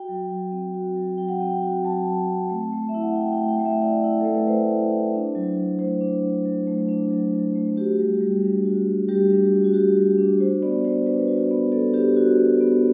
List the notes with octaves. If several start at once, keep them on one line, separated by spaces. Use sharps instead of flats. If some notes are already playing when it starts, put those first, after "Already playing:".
Already playing: F#4 G5
F#3
F#3
C4
F#4
F#3
F#3 G5
F#5
C4 G5
F#4
F#3 A5
F#3
C4
A3
A3
E5
E4
F#5
E4 G5
G5
A3
G5
A3
E5
E4 D5
E4
A3 A4
B4
A3 C5
E4
E4
D4
F#3
F#3
A3 C5
D4
F#3
F#3
A3
D4
F#3
F#3
A3
F#4 G4
G3
G3
D4
F#4
G3
G3 G4
D4
F#4
F#4
G3 G4
G3
D4
F#4 C5
B3 D5
B3 C5
D4 B4
F#4
B3
B3 A4
D4 G4
F#4
B3
B3